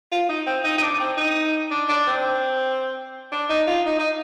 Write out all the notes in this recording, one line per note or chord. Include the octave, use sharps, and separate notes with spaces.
F4
D#4
C4
D#4
D#4
D4
C4
D#4
D4
D4
C4
D4
D#4
F4
D#4
D#4